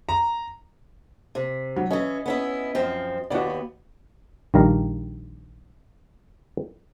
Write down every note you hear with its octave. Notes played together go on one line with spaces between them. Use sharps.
A#5
C3
F#3
E3 C#4 D#5
B3 C#4 E4
F#2 F3 C4
D#2 B3 F#4 G4 D5
A#1 D#3 G3 F5 A#5